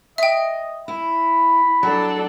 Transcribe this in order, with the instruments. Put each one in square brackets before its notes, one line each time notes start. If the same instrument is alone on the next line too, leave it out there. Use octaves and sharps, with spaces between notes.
[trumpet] D#5 [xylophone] E5 G5
[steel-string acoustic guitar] E4 [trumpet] B5
[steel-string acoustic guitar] F#3 [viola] D4 A4